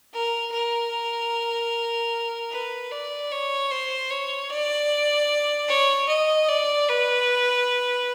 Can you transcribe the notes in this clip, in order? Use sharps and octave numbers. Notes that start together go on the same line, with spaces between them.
A#4
A#4
B4
D5
C#5
C5
C#5
D5
C#5
D#5
D5
B4